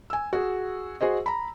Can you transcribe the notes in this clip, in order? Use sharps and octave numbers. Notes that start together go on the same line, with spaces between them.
G#5 E6
F#4 G#4
F#4 G#4 C5 D#5
A#5 B5